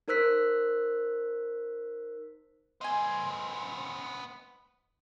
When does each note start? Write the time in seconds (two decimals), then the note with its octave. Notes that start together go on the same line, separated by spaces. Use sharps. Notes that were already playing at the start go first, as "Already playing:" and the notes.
0.08 D#4 A#4 C5 E6 F#6 B6
2.81 B3 C5 D#5 G#5